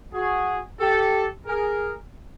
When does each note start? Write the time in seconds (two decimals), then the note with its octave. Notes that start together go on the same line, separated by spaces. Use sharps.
0.13 F#4 G#4
0.79 G4 A4
1.46 G#4 A#4